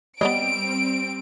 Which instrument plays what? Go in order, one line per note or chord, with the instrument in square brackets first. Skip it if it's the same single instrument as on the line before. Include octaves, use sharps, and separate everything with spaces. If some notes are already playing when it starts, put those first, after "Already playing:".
[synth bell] G3 [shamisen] B3 C#5 D#5 [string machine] C4 [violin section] D7